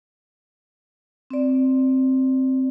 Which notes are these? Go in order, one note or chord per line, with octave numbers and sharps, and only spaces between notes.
C4 D5